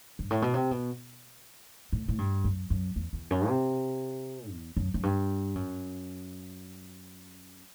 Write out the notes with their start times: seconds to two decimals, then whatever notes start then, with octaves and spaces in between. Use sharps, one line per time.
0.19 G2
0.31 A2
0.42 B2
0.54 C3
0.71 B2
1.93 A2
2.08 A2
2.18 G2
2.44 F#2
2.70 F#2
2.96 E2
3.13 E2
3.31 F#2
3.48 C3
4.51 E2
4.77 F#2
4.94 F#2
5.03 G2
5.55 F#2